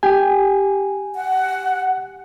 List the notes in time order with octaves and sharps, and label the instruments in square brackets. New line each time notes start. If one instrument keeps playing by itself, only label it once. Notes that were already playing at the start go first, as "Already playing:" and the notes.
[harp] G4 [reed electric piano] G#5
[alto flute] F#5